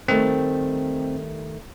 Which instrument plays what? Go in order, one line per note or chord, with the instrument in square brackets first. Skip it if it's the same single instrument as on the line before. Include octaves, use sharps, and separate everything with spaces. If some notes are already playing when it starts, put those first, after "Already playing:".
[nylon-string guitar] D#3 G3 A3 [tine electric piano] C4